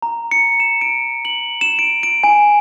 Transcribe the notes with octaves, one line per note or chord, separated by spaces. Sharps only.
A#5
C#7
E7
D7
F#7
E7
D7
D7
G#5